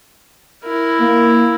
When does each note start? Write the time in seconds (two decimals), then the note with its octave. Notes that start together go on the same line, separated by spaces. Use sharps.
0.64 E4 A#4
1.00 A#3